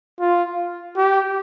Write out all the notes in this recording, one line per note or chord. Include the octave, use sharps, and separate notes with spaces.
F4
G4